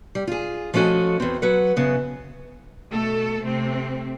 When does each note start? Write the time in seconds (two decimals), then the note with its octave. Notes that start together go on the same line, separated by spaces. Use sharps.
0.15 G3
0.27 F4 G#4
0.74 F3 A3 C#4 F#4 A4 D#5
1.20 E2 C4
1.42 F#3 B4 F#5
1.76 F#2 C#3 B3
2.91 B2 A3 A4
3.44 C3 A3 C4